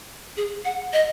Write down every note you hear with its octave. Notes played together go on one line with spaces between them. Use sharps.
G#4
F#5
D#5